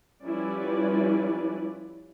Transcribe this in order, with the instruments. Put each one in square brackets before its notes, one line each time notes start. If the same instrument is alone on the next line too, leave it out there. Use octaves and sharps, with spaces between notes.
[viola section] F3 G3 C#4 E4 B4 D5